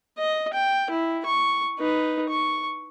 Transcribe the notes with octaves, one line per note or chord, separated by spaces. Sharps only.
D#5
G5
E4
C#6
D#4 B4
C#6